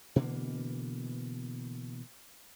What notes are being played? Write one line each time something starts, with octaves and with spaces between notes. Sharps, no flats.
B2 D3 E3 A#3